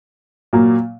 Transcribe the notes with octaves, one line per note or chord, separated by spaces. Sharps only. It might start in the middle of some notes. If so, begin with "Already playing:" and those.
A#2 F#3 A#3